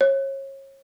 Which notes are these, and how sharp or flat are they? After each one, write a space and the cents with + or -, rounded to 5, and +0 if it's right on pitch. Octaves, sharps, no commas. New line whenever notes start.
C#5 -30